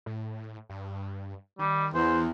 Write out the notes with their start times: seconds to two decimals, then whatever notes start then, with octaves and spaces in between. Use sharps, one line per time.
0.06 A2
0.70 G2
1.59 D#3 G3
1.95 E2 E3 C5